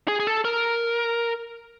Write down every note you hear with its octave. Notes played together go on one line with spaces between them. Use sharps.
G#4
G#4
A4
A#4